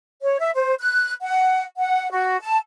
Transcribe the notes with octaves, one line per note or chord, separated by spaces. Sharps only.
C#5
E5
C5
F#6
F#5
F#5
F#4
A5